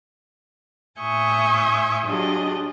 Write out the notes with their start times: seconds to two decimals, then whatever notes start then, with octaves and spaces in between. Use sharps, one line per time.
0.99 A2 E5 G#5 C#6 D#6 G6
2.05 F#3 D4 F4 G4 G#4 D#5